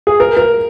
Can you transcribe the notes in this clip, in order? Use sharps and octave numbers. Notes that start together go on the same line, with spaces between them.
G#4
A#4
A#4